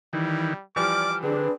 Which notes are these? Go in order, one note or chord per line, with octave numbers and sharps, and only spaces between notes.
D#3 E3 G3
E3 F3 G3 D5 D6 F6
D3 C4 D4 G#4 B4